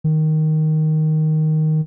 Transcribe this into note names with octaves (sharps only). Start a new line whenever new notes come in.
D#3